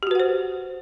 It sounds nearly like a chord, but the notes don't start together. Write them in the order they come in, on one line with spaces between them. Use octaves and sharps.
G4 F#4 B4 F#5 C5